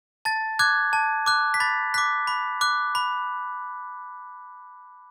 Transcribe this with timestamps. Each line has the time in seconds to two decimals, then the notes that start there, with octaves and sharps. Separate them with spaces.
0.25 A5 A6
0.59 D6 F#6 G#6
0.93 A5
1.26 D6 F#6
1.54 B6
1.60 B5 A6
1.94 D6 F#6 B6
2.27 B5
2.61 D6 F#6
2.95 B5